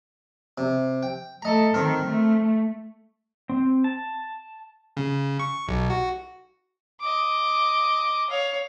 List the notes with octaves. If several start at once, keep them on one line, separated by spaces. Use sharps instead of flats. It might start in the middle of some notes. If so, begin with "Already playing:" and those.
C3
G5
A3 A4 D#5 A#5
D#3 C4 A#4
A3
C4
A5
C#3
C#6
B1
F#4
D#5 D6
C#5 F5